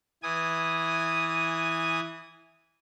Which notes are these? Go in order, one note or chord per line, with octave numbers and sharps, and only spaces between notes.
E3 G#5 D#6